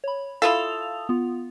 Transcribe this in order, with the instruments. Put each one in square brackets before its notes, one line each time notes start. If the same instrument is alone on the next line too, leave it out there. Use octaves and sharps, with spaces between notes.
[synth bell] C#5 B5
[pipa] E4 F4 A4 [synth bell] F5 D#6 F7
[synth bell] B3 F4